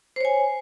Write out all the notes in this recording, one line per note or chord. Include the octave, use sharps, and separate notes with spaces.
C5 C#5 G#5